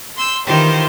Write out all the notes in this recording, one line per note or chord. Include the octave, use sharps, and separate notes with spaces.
C6 E6 G6
D#3 E3 F4 G4 C5